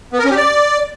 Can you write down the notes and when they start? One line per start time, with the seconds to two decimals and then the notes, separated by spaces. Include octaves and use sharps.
0.13 B3
0.19 A#4
0.25 C#4
0.31 G4
0.36 D5